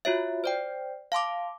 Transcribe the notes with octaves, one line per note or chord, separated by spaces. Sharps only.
F4 F#4 C#5 E5
C5 D5 G5
F5 A5 C6 D6